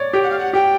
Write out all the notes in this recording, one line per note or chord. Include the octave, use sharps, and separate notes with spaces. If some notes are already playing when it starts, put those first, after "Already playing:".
Already playing: C#5 D5
G4 G5
F#5
F5
F#5
G4 G5